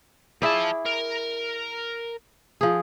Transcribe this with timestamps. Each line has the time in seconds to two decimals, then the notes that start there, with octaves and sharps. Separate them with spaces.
0.42 F3 E4 G#4 D5 A5
0.86 A#4
2.61 F3 G#4